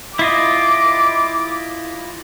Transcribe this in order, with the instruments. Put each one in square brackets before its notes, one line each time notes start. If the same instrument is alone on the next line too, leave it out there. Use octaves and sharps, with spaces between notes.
[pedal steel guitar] E4 F4 D#5 [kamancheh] D6